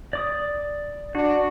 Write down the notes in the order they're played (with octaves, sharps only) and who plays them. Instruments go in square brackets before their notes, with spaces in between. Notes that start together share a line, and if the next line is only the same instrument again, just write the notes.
[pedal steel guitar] D5 D6 D#6
[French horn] D4 [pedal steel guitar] F#4